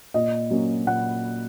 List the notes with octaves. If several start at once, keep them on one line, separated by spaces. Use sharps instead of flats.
A#2 D#5
F#3 A#3 C#4
A#2 F#5